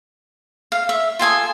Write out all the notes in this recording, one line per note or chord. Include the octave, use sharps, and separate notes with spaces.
F5
E5
F4 A4 G#5 D#6